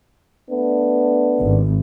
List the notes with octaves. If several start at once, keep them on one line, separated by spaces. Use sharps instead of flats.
A3 B3 D4
G#1